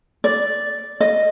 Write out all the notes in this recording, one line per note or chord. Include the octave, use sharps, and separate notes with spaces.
D5
D#5